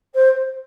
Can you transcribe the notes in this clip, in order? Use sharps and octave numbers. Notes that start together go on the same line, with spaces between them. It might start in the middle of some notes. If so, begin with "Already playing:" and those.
C5